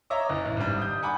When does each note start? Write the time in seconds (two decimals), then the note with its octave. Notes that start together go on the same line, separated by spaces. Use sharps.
0.10 C#5 D#5 E5 A#5 D6
0.29 F#1
0.45 A1
0.57 G#1 G3
0.78 D#6 G6
1.03 F#5 G#5 B5 D6